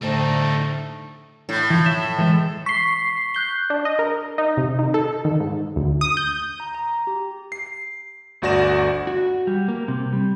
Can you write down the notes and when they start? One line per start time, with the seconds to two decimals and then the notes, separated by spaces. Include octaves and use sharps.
0.02 A2 D3 G3 A3 D#4 C5 A5
1.49 A2
1.70 E3 F3
1.86 E5
2.18 E3 G#3 A4
2.66 C#6 B6 C7 G7
3.34 F#6 G6 G7
3.70 D4
3.85 D#5
3.99 A#4
4.38 D#4
4.57 C3
4.79 D#3
4.94 A4
5.25 D#3
5.40 G#2
5.76 D2
6.01 D#6
6.17 G6
6.60 A#5
6.75 A#5
7.07 G4
7.52 C7
8.42 G1 D2 F#4 D5 A#6 E7
9.07 F#4
9.47 G3
9.68 A#3
9.88 C3
10.13 G3